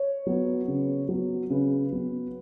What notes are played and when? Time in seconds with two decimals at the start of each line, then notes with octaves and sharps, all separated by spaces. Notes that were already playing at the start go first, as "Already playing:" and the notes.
Already playing: C#5
0.27 F#3 B3
0.68 C#3
1.09 F#3 B3
1.50 C#3 B4
1.92 F#3 B3